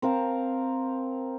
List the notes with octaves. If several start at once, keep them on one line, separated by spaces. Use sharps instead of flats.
C4 A#4 F5 A5